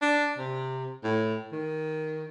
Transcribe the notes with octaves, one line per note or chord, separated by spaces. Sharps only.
D4
C3
A2
D#3